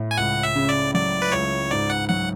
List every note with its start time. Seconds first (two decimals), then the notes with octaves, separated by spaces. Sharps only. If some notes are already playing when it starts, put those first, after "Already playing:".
Already playing: A2
0.11 G#5
0.17 C#2 F#5
0.43 E5
0.55 C#3
0.69 D5
0.94 F#3 D5
1.22 B4
1.32 C#2 C#5
1.71 G#2 D5
1.90 F#5
2.09 F#3 F#5